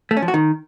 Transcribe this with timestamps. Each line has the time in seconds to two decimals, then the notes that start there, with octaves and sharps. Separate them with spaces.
0.11 A3
0.17 C#4
0.22 F3
0.28 F#4
0.34 D#3